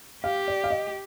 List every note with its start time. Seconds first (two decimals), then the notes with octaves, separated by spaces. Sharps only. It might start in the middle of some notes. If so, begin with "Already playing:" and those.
0.24 G4 F5
0.48 D5
0.64 F5
0.70 D#5